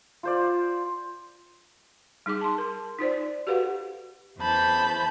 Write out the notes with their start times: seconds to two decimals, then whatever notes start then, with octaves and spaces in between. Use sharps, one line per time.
0.23 F4 C5 D5
2.26 G3 D#4 G#4 D6
2.41 A5 C6
2.58 A#4
2.99 D#4 F4 C5 D5
3.47 F#4 G4 A4 B4 F5 F#5
4.39 E2 E3 C5 A5 B5 G6